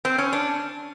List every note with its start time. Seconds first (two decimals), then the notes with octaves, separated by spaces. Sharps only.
0.05 C4
0.18 C#4
0.33 D4